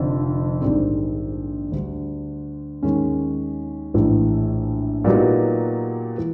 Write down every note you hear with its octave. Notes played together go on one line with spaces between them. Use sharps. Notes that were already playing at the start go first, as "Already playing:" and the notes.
Already playing: F1 F2 D3
A#1 G#2 D#3 G3 C4
D2 D3 G3
D#2 D#3 G#3 C#4
A#1 A2 E3
A#2 F#3 B3 D#4 G4
E3